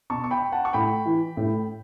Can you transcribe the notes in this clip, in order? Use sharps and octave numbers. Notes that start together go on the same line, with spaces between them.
B2 A5 C#6
C#6
G5 B5
F#5 A5
C#6
A2 G5 B5
E3
A2